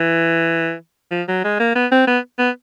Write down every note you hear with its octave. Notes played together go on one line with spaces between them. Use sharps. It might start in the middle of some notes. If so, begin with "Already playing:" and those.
Already playing: E3
F3
F#3
G#3
A#3
B3
C4
B3
B3